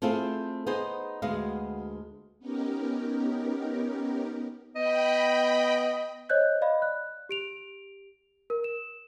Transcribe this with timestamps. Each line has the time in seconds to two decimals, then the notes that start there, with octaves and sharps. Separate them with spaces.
0.02 A3 C4 E4 F4 G#4 A4
0.67 B3 D#4 G#4 C5
1.22 D2 G#3 B3 F#4 F5
2.39 B3 C#4 D#4 G4 A#4
4.76 B3 D#5 G5 B5
6.29 C5 C#5 D#5 F#6 G6
6.62 D5 D#5 F5 B5
6.82 F#6
7.29 G4 D7 F7
8.50 A#4
8.64 E7